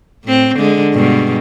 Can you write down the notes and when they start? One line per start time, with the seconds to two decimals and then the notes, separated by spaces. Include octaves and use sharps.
0.24 A2 C4
0.56 D3 G#3
0.94 G2 B2 G#3